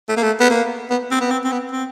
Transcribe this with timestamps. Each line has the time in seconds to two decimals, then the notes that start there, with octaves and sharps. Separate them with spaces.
0.09 A3
0.17 A#3
0.23 A3
0.40 B3
0.50 A#3
0.90 B3
1.11 C4
1.21 B3
1.31 C4
1.44 C4
1.52 B3
1.71 C4